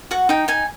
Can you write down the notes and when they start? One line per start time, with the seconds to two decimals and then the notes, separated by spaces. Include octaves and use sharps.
0.11 F#4 F#5
0.29 D#4 G5
0.48 D#4 G#5